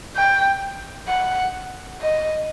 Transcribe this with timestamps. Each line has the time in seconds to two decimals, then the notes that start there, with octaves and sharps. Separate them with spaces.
0.17 G5
1.08 F#5
2.01 D#5